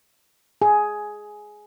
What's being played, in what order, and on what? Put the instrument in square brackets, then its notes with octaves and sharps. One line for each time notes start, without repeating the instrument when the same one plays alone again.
[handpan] G#4